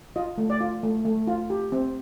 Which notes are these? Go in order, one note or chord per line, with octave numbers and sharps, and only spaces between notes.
F4 D#5
A3
D5
F4
A3
A3
F4
G4
C4